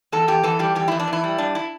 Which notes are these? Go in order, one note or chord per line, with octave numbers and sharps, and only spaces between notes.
E2 A4
E2 G4
E3 A4
G3 G4
E2 G4
E2 E4
D4
E3
E4
G3
G2 D4
E4